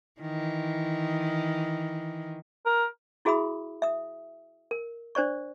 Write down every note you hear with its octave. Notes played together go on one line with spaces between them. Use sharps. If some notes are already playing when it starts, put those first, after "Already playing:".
D#3 E3
A#4
E4 F#4 G#4 E5 B5 D#6
E5 D#6
A#4
D4 C5 D5 C#6